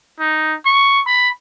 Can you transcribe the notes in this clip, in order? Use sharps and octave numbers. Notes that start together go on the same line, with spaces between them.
D#4
C#6
B5